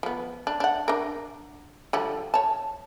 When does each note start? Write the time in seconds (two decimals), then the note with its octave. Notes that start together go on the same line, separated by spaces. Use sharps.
0.03 F3 B3
0.47 D4
0.60 D4 F#5
0.88 D4 A#4
1.93 D3 F3 G3
2.34 C#5 A5